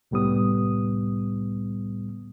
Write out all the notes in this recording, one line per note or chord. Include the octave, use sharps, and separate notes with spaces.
C2 A2 G3 B3 D#6